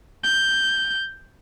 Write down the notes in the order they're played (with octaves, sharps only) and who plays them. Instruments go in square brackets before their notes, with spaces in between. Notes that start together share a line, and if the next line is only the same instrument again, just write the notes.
[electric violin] G6